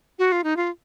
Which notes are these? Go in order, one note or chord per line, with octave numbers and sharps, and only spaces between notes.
F#4
F4
D#4
F4